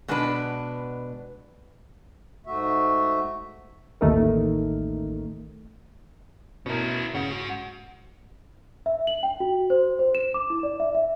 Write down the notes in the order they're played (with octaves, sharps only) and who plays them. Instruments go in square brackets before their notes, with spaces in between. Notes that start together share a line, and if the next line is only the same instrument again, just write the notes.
[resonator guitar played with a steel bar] B2 G#3 B3 D4 B4
[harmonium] G#2 A3 F#4 E5
[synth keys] A1 D#2 A3 D#4 A#4
[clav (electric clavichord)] B2 A#4 [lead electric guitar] C#4 E4
[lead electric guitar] G#2 F#5 [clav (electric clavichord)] C#3
[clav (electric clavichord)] F#4
[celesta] E5
F#7
G5
F#4
C5
C5
E7
D6
E4
D5
E5
E5